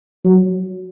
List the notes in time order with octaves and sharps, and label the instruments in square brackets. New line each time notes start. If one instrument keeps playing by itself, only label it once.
[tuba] F#3